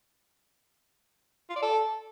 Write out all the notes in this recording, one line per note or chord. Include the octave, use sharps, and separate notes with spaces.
F4
D5
A4